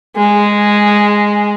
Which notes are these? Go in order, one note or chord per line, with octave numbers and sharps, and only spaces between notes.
G#3